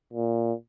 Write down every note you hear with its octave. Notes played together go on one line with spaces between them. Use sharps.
A#2